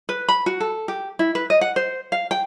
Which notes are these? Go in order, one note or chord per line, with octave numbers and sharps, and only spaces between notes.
B4
B5
F#4
A4
G4
E4
B4
D#5
F#5
C5
F5
G5